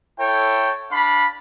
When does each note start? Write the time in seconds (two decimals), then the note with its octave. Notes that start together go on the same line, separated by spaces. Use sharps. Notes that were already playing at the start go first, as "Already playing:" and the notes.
0.19 E4 A4 C#5 G5
0.91 D4 F5 B5